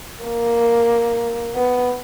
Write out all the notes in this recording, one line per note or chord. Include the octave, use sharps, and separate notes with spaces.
A#3
B3